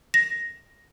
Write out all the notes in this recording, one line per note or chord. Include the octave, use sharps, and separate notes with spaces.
A#6